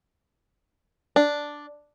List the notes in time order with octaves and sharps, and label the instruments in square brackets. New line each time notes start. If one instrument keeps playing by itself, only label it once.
[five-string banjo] D4